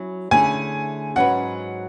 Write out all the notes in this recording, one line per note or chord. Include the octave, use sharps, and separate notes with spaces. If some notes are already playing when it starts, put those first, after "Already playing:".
Already playing: F#3 C#4 E4
D3 A3 C#4 E4 G#4 G#5
G#2 F#3 C#4 F#4 B4 F#5